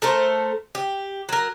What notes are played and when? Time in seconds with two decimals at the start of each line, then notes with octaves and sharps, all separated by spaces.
0.02 A3 A4 A#4 C5
0.75 G4
1.29 F#3 A#4